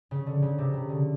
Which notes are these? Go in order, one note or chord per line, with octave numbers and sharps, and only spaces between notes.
C#3
D3
C#3
C3
C#3
D3